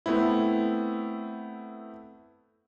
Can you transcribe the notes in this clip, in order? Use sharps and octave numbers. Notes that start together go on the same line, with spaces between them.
A3 B3 C4 E4